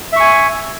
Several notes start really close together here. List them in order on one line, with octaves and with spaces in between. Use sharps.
E5 C#6 G#5